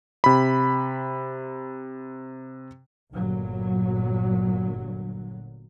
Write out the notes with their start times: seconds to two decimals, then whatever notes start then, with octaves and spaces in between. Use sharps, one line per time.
0.24 C3 B5
3.13 G1 A#2 F#3